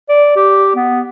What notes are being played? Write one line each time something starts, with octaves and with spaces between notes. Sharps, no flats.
D5
G4
B3